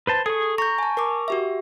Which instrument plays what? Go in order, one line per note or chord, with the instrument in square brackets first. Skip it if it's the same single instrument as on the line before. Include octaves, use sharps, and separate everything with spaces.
[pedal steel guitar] B4 C5 A5
[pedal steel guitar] G#4 C#6 [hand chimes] A4
[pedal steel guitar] A#5 [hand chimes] C#6 G6
[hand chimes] G#5 A5
A#4 C#6 D6
F#4 G4 E5